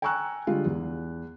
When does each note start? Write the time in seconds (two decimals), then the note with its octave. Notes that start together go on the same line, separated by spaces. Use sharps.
0.02 G5 G#5 A#5 C#6 E6 F#6
0.47 D3 G3 G#3 F4
0.65 E2